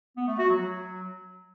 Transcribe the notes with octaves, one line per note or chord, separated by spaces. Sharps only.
B3
A3
F#4
F#3
F#3